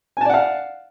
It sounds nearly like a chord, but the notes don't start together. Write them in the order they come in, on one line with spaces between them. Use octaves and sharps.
G#5 A5 D5 F#5 F5